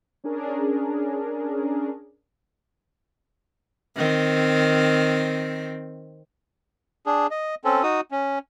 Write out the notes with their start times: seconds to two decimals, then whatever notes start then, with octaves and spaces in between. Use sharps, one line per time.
0.24 C#4 D4 G#4 A#4
3.96 D#3 C4
7.06 D4 G#4
7.31 D#5
7.65 C4 C#4 A4
7.83 D#4 F#4 D#6
8.11 C#4